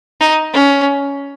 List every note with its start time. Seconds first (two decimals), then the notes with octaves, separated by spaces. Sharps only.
0.20 D#4
0.53 C#4